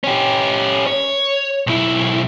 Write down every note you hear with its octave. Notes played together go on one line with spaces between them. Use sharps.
C#4 G4
C#5
B1 E4